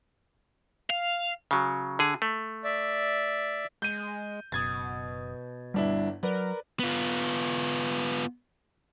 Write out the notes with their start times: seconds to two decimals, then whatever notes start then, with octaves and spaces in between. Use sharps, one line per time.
0.90 F5
1.51 C#3 F#3
1.99 D3 G#4
2.22 A3
2.64 D5 E5
3.82 G#3 G6 D#7
4.52 F#1 B2 D#6 G#6 A6
5.74 G1 G3 D4 E4
6.23 F#3 A#4 B4 D5
6.79 B3 F4